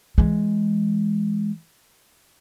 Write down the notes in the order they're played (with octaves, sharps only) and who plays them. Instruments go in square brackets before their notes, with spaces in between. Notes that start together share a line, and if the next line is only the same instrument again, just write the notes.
[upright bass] E3 G#3